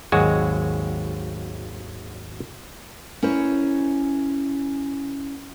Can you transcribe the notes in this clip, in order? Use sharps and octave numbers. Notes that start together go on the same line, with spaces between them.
G#1 D#2 F#3 G#3 F#4 G#5
C#4 E4 A#4 C5 C#5